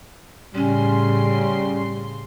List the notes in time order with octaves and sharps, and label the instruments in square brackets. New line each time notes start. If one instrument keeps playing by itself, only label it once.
[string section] A2 C#3 C6 [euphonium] G3 [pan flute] C#4